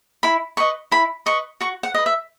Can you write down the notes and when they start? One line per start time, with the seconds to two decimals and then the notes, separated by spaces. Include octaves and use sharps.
0.23 E4 B5
0.57 B4 D#5 C#6
0.91 E4 B5
1.26 B4 D#5 C#6
1.61 F#4 C#6
1.83 F#5
1.94 B4 D#5
2.06 E5